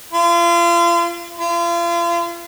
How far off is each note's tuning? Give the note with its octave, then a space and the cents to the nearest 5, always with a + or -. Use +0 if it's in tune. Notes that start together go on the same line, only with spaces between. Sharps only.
F4 -35
F4 -40